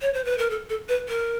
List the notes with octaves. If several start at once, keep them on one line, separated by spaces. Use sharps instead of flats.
C#5
C5
B4
A#4
A4
A4
B4
A#4